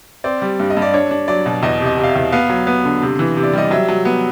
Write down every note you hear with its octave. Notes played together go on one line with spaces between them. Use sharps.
C4 D5
G3
G2
D#5
G2
D5
D4 C#5
D4
F#3 D5
B2
E2 D#5
C3
D#5
C3
F5
E5
E2
B3 F5
F#3
B3
D3
C3
E3
C3
D5
G3 D#5
F#3 E5
F#3
B3